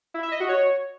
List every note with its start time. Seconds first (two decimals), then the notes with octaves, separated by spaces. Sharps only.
0.14 E4
0.23 E5
0.32 D#5
0.40 F#4
0.49 C#5